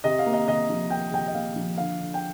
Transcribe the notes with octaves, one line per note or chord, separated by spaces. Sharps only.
C3 D#5
F5
A#3
D#5
C3 D#5
F3
A#3 G5
C3 G5
D#5
A#3 F5
F3
D3 F5
D3
G5